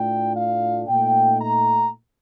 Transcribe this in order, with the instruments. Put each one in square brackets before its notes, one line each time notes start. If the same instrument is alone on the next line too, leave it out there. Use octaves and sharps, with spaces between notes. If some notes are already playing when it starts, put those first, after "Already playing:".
Already playing: [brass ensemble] A2 A3 D4 F4 G5
F5
A#2 A3 D#4 G5
A#5